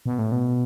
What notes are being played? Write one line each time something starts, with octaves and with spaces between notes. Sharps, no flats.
B2
A2
B2